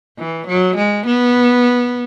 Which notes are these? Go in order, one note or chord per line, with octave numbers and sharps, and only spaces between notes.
E3
F#3
G#3
B3